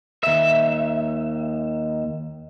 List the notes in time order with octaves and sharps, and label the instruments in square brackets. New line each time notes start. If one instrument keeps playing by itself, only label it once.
[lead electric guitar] D#2 E5